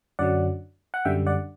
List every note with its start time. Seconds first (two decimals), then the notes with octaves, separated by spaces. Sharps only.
0.19 F#2 D3 F#3 D5 F#5
0.94 F#5
1.05 F#2 D3 G3 E5 G5
1.27 D5 F#5